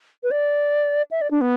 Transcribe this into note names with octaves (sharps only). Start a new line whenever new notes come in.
B4
D5
E5
D5
D4
B3